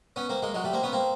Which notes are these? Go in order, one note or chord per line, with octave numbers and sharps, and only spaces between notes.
B3 C#4
A#3 C4
G#3 A#3
F#3 G#3
G3 A3
A#3 C4
B3 C#4
A#3 C4